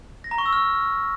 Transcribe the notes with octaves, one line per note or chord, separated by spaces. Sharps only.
A#6
A#5
C#6
E6
F6